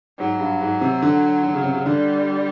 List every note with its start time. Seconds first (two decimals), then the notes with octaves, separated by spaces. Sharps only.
0.19 G#2 F#3
0.40 G2
0.61 G#2
0.81 C3
1.02 D3
1.43 D3
1.54 C#3
1.64 C3
1.73 C#3
1.86 D3 G3